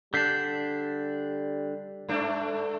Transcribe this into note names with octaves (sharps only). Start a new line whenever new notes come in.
D3 G3 D4 G6 B6 C7
G2 A3 D4